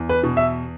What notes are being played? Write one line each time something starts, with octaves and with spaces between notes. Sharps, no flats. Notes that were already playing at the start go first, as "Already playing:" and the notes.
Already playing: E2
B4
B2
E5